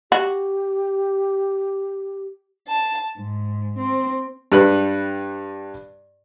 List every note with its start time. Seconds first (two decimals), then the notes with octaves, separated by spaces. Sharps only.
0.12 F#4 G4
2.67 A5
3.18 G#2
3.78 C4
4.52 G2 G3 B4 B5 F#6